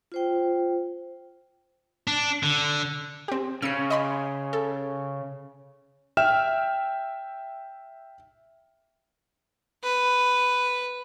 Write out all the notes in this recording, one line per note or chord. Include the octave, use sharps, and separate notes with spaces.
F4 C5 G5
D4
D3
C4 G4
C#3 E6 C7
D#5 B5 C6
A4
E5 G5 F6 E7
B4